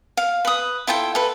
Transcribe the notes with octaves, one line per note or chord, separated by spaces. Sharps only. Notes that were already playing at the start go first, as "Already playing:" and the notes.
F5
B4 D#6
E4 F4 A4 G5
A4 B4